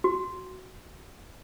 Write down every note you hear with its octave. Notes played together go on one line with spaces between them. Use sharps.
F#4